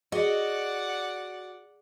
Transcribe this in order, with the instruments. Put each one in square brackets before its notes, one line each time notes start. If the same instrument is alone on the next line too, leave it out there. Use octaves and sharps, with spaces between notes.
[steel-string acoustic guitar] F#4 [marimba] G#4 [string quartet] D5 F#5 [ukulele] D#5